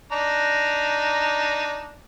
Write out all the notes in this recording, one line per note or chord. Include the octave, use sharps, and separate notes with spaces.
D4 D#4 A#5